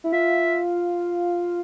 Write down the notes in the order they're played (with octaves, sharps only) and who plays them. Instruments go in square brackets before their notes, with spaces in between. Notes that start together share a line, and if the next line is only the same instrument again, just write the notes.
[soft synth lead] E4
[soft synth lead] F4 [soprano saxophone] E5